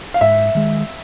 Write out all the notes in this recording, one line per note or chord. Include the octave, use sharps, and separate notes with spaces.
F5
G#2 E5
D#3 G#3